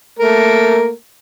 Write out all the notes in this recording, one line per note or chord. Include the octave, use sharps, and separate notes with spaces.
A3 A#3 A#4